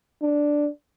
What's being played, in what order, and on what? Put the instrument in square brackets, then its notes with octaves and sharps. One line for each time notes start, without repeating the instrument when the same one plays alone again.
[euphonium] D4